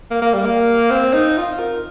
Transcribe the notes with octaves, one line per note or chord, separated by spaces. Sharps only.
A#3
A#3
G3
A#3
C4
D#4
F4
A#4